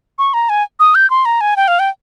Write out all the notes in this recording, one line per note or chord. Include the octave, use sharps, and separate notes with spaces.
C#6
A#5
G#5
D#6
G6
C6
A#5
G#5
G5
F5
G5